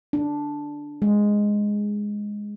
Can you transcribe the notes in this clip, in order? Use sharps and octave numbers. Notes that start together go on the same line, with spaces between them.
D4
G#3